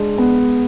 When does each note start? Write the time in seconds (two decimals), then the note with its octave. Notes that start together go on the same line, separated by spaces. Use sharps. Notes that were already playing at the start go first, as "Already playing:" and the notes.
Already playing: G#3 D4
0.18 B3